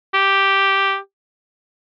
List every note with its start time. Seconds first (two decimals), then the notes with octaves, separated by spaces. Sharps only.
0.14 G4